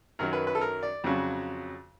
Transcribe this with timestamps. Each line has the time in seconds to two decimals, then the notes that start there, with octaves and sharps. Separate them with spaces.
0.19 F#2 D#3 F#3 A#4
0.33 B4
0.47 B4
0.55 A4
0.61 A#4
0.83 D5
1.04 F2 C#3 F#3